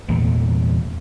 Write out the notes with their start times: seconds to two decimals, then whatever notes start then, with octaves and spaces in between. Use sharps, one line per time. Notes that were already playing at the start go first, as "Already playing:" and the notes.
0.09 E2 A#2 E3 A3